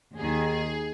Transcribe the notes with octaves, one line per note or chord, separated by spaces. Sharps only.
D#2 D#3 G#4